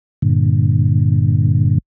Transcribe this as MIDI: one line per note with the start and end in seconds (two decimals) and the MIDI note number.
0.22 1.78 43
0.22 1.78 46
0.22 1.78 50